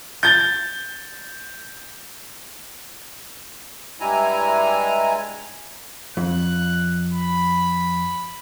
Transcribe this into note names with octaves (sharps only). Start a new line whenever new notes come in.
G6 A6 G7
G2 G3 G#3 E4 G#5 A#5
F2 F#6
B5